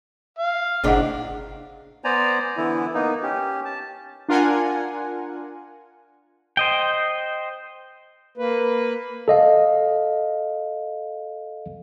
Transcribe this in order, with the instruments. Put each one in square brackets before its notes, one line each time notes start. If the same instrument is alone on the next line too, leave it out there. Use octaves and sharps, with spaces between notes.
[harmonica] F5
[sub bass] G1 [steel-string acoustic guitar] A2 C3 D4 [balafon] G#4 D#5 F#5
[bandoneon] B3 C5 D5 G#5 A#5
D3 E3 B3 E4
A#3 B3 D#4
C#4 G4
A5
[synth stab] D4 F4 A#4 F#5 G#5
[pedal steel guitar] C5 D#5 G5
[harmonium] A#3 B4
[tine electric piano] A4 D#5 F5